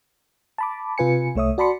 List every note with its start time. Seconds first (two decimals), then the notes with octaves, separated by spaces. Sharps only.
0.58 A5 B5 D6
0.98 C3 F4 B4 G#5 C#7
1.35 C2 A3 C#5 E5 D#6
1.58 F#4 D5 A5 B5 C6 C#7